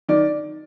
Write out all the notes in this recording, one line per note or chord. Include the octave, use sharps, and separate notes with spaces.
D#3 D5